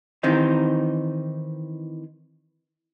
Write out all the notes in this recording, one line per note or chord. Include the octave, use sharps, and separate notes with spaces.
D#3 E3 C4 D#4 G4